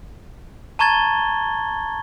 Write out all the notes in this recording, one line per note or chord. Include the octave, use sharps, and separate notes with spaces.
A5 A#5 C#6 G#6 A6 G7